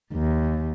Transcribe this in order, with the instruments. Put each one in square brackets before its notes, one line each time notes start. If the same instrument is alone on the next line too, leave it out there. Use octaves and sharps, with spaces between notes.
[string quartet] D#2